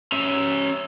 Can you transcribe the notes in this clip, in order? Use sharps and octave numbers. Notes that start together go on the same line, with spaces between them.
C#4 E5